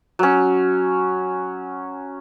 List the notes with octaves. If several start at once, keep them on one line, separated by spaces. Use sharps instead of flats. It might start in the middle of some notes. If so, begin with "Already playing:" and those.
F#3 C#4